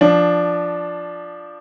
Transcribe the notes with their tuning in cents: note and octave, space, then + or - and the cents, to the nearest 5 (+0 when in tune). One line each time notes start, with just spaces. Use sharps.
F3 +0 D4 +0